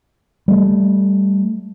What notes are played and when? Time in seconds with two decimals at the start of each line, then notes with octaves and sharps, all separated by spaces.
0.48 G3 A3